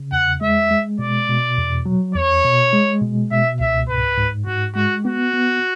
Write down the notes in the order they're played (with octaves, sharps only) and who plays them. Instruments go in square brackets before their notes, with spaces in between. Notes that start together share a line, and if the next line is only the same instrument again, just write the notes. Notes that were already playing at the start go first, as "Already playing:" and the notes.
Already playing: [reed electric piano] C#3
[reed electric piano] E2 [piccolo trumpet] F#5
[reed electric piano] G#3 [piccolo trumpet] E5
[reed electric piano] G#3
[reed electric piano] B2 [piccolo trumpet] D5
[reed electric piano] B2
E2
F#3
[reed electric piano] E2 [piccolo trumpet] C#5
[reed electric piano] B2
G#3
B2
[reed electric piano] B2 [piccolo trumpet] E5
[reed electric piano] C#2 [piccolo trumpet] E5
[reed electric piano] G#2 [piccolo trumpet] B4
[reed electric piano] G#2
[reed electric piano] G#2 [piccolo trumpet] F#4
[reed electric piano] G#3 [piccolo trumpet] F#4
[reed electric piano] B3 [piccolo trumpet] F#4
[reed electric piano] B3